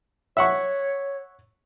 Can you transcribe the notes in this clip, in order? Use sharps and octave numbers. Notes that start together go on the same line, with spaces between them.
C#5 E5 F#5 C#6